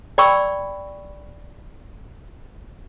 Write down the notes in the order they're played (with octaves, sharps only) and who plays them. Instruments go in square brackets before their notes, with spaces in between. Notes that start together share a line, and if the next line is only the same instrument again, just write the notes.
[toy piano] D5 G5 B5 C#6 E6